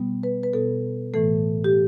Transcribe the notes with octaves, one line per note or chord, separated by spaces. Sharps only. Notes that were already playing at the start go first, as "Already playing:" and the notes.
Already playing: B2 G3 B3
B4
B4
B2 B3 A4
A2 E3 A3 A4
G4